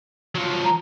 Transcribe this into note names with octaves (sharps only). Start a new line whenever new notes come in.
F3 F#3
A#5